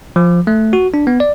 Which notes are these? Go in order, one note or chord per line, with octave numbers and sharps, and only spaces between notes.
F3
A3
F#4
D4
B3
D5